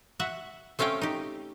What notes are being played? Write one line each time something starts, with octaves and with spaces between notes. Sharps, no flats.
F#4 E5 F#5
A3 C4 C#4 F5 G5
D#4 G4